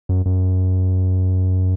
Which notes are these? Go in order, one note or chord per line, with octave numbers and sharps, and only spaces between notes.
F#2
F#2